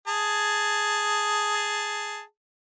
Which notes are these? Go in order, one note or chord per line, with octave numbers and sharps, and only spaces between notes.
G#4 A5